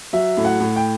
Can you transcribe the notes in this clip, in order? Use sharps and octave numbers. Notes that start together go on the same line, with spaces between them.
F#3 E5
A2
F#5
A2
G5